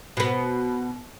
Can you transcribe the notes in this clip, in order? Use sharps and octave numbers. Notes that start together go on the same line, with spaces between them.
B2 B3